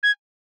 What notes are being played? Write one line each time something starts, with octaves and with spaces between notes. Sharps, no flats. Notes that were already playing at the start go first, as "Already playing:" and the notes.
G#6